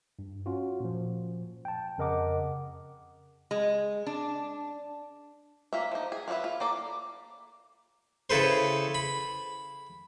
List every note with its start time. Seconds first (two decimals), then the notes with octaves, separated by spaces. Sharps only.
0.19 G2
0.46 C#4 F4 F#4
0.80 A#2 F3
1.65 G5 A5
1.98 F2 C#3 A#4 D#5 F#5 D6
3.51 G#3
4.07 D4
5.73 A#3 F4 E5
5.91 F3 D#4
6.12 G#4
6.28 F4 G#4 A4 B4 E5
6.44 F4
6.60 A#3 A4 D5
8.30 C#3 E4 A4 B4 C5
8.95 B5